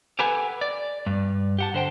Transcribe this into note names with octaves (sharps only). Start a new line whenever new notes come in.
G4 A4 B4 F#5 G#5
D5
G2
G4 F#5 A5
D3 C5 G5